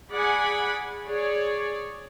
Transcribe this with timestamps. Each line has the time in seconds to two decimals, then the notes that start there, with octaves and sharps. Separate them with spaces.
0.13 G#4 D5 F#5 G#5 B5
1.06 G#4 C#5 D5